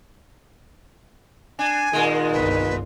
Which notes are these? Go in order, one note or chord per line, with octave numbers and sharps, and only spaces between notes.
D4 G#5
A#2 D#3 G#3
G1 C2 B4